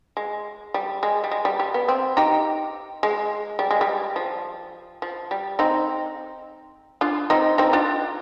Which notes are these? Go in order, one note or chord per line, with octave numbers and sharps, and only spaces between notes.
G#3
G3
G#3
G3
G#3
G3
G3
B3
C4
D#4 G4
G#3
G3
G#3
G3
F3
F3
G3
C4 D#4
D4 F4
C4 D#4
C4 D#4
D4 F4